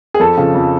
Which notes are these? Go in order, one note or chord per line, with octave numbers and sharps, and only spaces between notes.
G#4
F2 A4
C#3 F3
F2